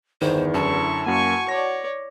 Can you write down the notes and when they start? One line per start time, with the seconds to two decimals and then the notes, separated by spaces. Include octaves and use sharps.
0.21 G1 E2 D#3 C5
0.54 F#2 D3 E4 A5 C#6
1.06 F#2 A#3 F#4 G#5 C#6
1.49 C#5 D5 A#6